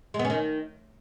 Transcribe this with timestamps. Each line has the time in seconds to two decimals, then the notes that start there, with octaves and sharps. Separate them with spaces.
0.14 G#3
0.19 B3
0.25 C#4
0.30 D#3